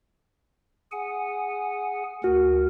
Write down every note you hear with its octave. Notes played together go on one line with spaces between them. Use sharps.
G#4 F#5 G#5
D2 F#4 A#4